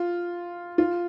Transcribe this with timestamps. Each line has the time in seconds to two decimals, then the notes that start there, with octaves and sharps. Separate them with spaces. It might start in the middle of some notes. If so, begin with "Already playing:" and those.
Already playing: F4
0.78 F4